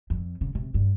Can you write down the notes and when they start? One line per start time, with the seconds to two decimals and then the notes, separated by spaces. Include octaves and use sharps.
0.10 F2
0.41 C#3
0.55 C3
0.74 G2